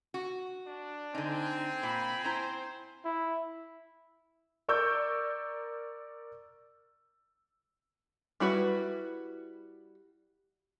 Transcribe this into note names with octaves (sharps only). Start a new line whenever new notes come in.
F#4
D4
D3 C4 D#4 G#5
A#2 B5
E4 C5 A#5
E4
A#4 D5 C#6 E6 G6
G3 E4 F#4 B4